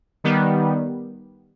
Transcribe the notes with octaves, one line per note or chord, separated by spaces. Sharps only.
D#3 G3 B3